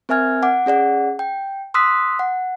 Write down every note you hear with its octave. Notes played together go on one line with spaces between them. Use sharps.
C4 A#4 E5 G#5 F6 G#6
F#5 D6
C#4 G#4 D5 F#5
G5
C6 D#6 E6 F#6 B6
F#5